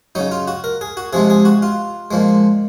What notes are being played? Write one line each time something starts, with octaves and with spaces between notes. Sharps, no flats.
C#3 F#3 D#4
F4
F#4
A#4
G#4
F#4
C3 F3 G#3 G#4
G#4
F#4
F4
A#2 F3 G#3